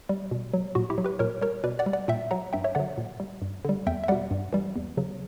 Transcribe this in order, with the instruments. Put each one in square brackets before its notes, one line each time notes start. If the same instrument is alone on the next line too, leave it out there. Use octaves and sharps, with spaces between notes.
[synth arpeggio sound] G3
B2
F#3
A#2 F#4
E4 G4
F#3
G4 B4
A#2 A#4 C#5
G3 A#4 C#5
B2 B4 D5
D5 F#5
G3
D5 F#5
A#2 E5 G5
F#3 F#5 A#5
G2 E5 G5
C#5 E5
D3 F#3 D5 F#5
A#2
G3
G2
D3 G3
E2 E5 G5
E5
B2 G3 D5 F#5
G2
E3 G3
E2
C#3 F#3